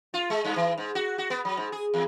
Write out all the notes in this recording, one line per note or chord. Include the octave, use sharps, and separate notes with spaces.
F4
G#3
G2
E3
G#2
F#4
F#4
B3
F#3
G#2
G#4
E2